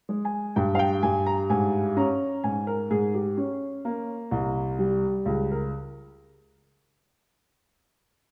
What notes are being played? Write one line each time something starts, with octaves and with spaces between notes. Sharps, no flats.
G#3
G#5
G2 G5
F5
G5
G2 G#5
A#5
G#2 G#5
C#4 A#5
G#2 G#5
A#4
G#2 G#4
G4
C#4
A#3
C2
G3
C#2
A#4